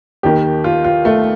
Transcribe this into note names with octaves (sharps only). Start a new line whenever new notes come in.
D#2 D#3 G4
F4
F4
A3